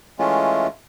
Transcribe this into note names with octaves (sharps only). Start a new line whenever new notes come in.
E3 G#3 A3 C#4 F4